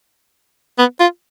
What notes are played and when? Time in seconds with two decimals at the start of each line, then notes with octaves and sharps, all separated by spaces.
0.78 B3
1.00 F4